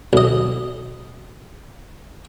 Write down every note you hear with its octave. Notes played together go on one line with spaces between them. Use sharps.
B1 D#5